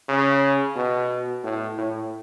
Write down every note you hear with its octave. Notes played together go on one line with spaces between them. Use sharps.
C#3
B2
A2
A2